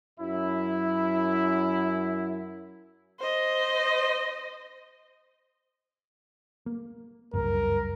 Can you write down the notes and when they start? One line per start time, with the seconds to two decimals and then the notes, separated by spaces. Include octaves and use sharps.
0.19 F#2 E4
3.20 C5 D#5
6.66 A#3
7.34 F#1 C#2 G2 A#4